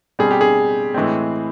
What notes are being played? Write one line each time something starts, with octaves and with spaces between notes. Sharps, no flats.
B2 G3 C4 G#4
G4
G#4
A2 E3 G#3 C4